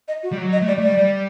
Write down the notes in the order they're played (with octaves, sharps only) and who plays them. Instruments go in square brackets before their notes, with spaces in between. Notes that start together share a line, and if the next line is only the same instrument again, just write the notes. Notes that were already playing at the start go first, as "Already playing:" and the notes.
[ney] D#5
F#4
[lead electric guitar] G3
F#3
[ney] D#5
[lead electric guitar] A3
[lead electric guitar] G3 [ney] D5
[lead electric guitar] A3
[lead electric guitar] G3 [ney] D5
[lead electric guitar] G3